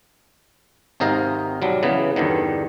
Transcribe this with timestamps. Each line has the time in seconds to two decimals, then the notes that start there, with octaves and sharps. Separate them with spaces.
1.00 G#1 C3 D#4 A#4 F5
1.62 B1 F#3 G3
1.83 C#3 E3 B3
2.16 E2 G2 D3 D#3